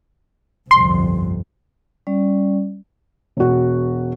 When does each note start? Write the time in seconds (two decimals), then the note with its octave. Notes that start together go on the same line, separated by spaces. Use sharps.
0.71 G1 C2 F2 C6
2.07 G3 C#4 D5
3.37 E1 F#4